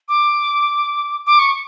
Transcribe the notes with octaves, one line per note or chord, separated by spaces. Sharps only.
D6
D6
C#6